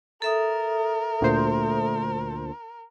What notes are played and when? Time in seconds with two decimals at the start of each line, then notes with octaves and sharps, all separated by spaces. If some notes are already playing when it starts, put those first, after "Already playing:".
0.22 A4 A#4 E5 D#6
1.21 D2 A#2 C5